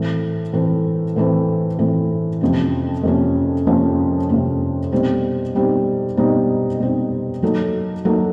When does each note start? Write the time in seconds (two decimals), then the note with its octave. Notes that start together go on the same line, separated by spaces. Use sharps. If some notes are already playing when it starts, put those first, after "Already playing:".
Already playing: A2 E3 A3 C4
0.53 A2 E3 A3 C4
1.16 A2 E3 A3 C4
1.79 A2 E3 A3 C4
2.41 F2 C3 F3 A#3 C#4
3.03 F2 C3 F3 A#3 C#4
3.67 F2 C3 F3 A#3 C#4
4.29 F2 C3 F3 A#3 C#4
4.92 B2 G3 C4 D#4
5.55 B2 G3 C4 D#4
6.17 B2 G3 C4 D#4
6.80 B2 G3 C4 D#4
7.42 F#3 A#3 D#4 F#4 A4
8.05 F#3 A#3 D#4 F#4 A4